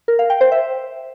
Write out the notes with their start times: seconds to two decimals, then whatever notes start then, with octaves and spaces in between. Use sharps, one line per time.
0.08 A#4
0.19 F5
0.30 G5
0.41 C5
0.52 E5